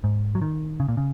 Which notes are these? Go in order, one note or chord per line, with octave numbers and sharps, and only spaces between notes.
G#2
F#3
D#3
C#3
A#2
C#3